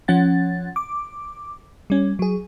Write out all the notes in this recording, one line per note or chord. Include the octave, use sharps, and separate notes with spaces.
F3 C#4 F#5 A6
D6
G3 C#4
F#3 G#4